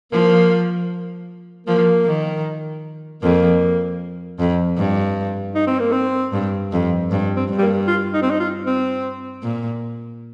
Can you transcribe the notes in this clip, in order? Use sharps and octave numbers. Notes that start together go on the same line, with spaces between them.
F3 A#3
F3 A#3
D#3
F2 A#3
F2
G2
D#4
C4
A#3
C4
G2
F2
G2
C4
G2
G3
A#3
F4
D#4
C4
D#4
F4
C4
A#2